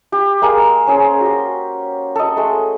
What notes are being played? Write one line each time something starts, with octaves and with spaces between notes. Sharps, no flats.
G4
G#3 A#3 G#4 G5
C#4 G#4 C5
F#4 G4
A4 D#5
G#3 A3